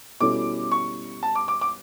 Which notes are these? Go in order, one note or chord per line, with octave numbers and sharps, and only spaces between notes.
B2 G3 C#4 E4 A4 D6
C#6
A5
D6
D6
D6